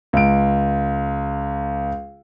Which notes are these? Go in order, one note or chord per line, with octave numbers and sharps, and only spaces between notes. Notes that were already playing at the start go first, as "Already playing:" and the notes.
C#2 D7